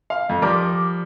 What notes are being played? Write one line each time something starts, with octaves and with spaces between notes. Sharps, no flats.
F5
F2
F3 G3 A#4 D6